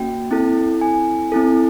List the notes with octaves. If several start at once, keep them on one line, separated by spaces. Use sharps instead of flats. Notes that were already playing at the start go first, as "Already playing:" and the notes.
Already playing: A#3 C#4 F#4 G5
C4 E4 A4
G#5
C4 E4 A4